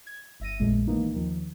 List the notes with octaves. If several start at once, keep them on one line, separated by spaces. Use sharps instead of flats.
G#6
G1 E5 A#6 D#7
A#1 F2 A#2 G#3 A3
D#3 E3 A3 A#3 D#4
D#2 D#3 F3